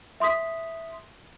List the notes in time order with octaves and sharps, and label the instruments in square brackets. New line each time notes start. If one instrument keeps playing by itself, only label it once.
[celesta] E5 C6 D#6 B6